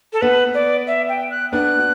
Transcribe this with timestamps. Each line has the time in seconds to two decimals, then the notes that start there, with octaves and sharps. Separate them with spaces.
0.13 A4
0.21 B3 B4
0.54 D5
0.87 E5
1.09 G5
1.31 F#6
1.52 B3 D4 F#6
1.78 F#4